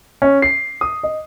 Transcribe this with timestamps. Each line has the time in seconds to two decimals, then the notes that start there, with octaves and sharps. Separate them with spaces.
0.22 C#4
0.42 C7
0.81 D#6
1.03 D#5